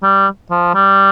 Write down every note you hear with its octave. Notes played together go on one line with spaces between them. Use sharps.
G3
F3
G3